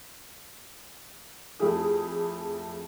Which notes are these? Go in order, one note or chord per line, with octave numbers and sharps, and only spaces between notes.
F2 A3 E4 G4 G#4 D#6